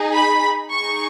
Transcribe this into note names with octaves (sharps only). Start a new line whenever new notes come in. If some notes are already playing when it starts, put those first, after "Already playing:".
Already playing: D#4 G#4
B5
D#4 G#4 C#6